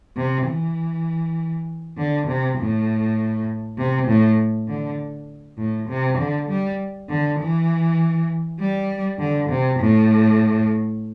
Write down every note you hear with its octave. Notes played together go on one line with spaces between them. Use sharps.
C3
E3
D3
C3
A2
C3
A2
D3
A2
C3
D3
G3
D3
E3
G3
D3
C3
A2